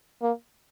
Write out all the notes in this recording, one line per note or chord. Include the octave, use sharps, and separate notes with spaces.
A#3